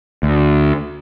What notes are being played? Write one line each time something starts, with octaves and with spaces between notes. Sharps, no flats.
D2